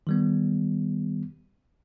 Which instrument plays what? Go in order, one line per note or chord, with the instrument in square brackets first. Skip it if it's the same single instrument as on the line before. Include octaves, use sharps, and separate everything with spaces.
[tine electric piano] D#3 G3 B3